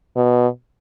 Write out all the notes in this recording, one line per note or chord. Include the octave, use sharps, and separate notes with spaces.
B2